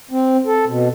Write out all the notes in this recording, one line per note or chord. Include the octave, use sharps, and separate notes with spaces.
C4
A4
B2